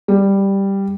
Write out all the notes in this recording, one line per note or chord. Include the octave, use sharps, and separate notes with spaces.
G3